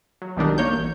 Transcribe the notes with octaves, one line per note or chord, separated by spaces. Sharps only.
F#3
B1 D#3 G3 D4 D#4
A#3 C#5 G6
A1